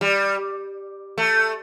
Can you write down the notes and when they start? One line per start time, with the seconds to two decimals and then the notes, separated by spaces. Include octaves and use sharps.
0.01 G3
1.18 A3